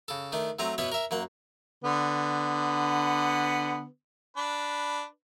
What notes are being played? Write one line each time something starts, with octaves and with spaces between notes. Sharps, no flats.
C#3 A4
D#3 A3 D4
F#3 A3 C4 A#5
B2 B3 E4 B4 C#5
A#4 E5
F#2 A#3 F#5
D3 B3
D4 B4